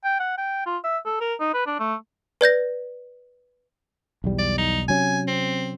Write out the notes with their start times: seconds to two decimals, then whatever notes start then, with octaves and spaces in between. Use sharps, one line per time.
0.05 G5
0.20 F#5
0.38 G5
0.66 F4
0.84 E5
1.06 A4
1.21 A#4
1.41 D#4
1.54 B4
1.67 D4
1.80 A3
2.41 B4 D5 G6 A#6
4.24 B1 E2 G3
4.39 D5
4.58 D#4
4.88 C3 F#3 C#4 G#5
5.28 C4